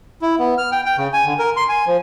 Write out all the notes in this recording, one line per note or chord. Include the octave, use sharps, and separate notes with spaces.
E4
B3
F6
G5
G5
C#3
G#5
D3
A#4
C6
G#5
F3